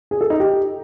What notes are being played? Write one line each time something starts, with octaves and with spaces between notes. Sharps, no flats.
G#4
A4
D#4
G4